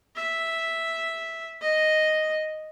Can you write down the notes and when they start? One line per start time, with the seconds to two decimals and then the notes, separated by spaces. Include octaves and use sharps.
0.16 E5
1.61 D#5